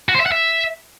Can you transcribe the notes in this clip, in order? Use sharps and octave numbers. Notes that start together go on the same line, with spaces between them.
F#4
C5
E5
F#5
E5